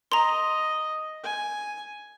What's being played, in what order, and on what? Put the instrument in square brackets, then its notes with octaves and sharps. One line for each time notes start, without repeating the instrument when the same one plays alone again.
[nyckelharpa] D#5 [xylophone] A#5 C6
[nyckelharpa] G#5